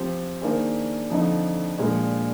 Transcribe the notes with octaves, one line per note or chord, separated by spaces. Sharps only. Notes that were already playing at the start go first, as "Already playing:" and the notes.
Already playing: F3 C4 G4 C5
D#3 A#3 D4 G#4 C5
F2 D3 F3 C4 D#4
A#2 F3 G#3 D4